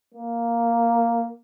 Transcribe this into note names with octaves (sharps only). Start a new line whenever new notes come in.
A#3